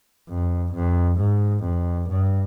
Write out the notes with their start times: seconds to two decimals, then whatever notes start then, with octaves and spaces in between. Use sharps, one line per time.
0.29 F2
0.75 F2
1.20 G#2
1.65 F2
2.11 G2